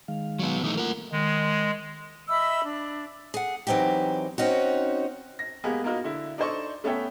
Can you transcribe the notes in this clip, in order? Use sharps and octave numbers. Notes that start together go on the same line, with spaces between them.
D#3 G#3 F5
F#3 B3
E3 A3 D#4 D#6
A3 A#3 F4 A#4 F#5
D#3 G#3
D#5 E5 B5 E6
D4
G#4 F#5
E3 F#3 C4 D#4 G4
C4 C#4 D#4 F#4
A#6
G#3 A#3 B3 G4 G#4
A#3 B3 D#4 F4 F#4
D3 E4
D4 D#4 A4 C5 D5 C#6
A3 B3 C#4 A4 E5 G5